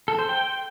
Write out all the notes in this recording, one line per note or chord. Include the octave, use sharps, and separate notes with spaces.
A4
C5
G5